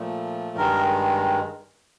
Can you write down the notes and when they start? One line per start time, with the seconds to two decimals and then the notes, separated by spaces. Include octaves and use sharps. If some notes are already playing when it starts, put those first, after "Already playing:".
Already playing: A#2 F3 A3
0.56 G2 D#3 G#3 A#4